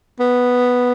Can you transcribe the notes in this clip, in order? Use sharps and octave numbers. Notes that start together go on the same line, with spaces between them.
B3